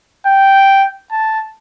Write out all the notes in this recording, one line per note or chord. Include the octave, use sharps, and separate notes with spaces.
G5
A5